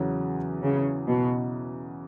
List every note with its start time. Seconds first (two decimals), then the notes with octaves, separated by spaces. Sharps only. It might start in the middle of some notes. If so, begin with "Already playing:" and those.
Already playing: E2 C#3 F#3
0.63 C#3
1.07 B2